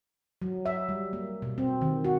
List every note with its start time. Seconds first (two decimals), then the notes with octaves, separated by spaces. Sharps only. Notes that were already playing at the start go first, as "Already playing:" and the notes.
0.42 F#3
0.66 E5
0.89 G3
1.13 A#3
1.42 B2
1.58 C4
1.81 D#3
2.04 F#4